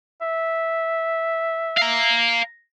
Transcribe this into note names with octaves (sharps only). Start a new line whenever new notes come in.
E5
F5 A#5